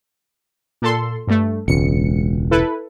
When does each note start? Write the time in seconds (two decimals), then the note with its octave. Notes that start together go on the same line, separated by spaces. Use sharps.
0.82 A#2 A4 C6
1.27 G2 A3
1.68 E1 C#2 C#7
2.51 E4 A4 B4